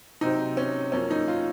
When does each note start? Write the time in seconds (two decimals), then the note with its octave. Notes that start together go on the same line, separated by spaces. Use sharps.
0.21 C3 F#3 C4 D#4
0.57 C#4
0.92 F#2 F3 A#3 C#4
1.11 D#4
1.28 F4